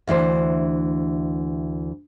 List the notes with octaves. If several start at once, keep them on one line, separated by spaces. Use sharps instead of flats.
D2 E3 D4 C5